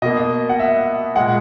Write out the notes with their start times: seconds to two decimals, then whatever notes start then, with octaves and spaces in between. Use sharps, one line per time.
0.02 B2 A#3 D#5
0.49 F#5
0.60 E5
1.16 A#2 G#3 F#5